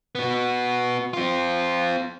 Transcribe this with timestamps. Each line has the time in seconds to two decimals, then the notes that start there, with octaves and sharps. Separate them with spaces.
0.15 B3 F#4
1.13 C4 F4